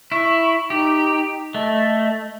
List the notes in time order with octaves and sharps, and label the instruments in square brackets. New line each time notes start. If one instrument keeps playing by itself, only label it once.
[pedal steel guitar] E4 [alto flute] C#6
[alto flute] D#4 [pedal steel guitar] G4
[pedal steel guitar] A3 [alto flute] D#5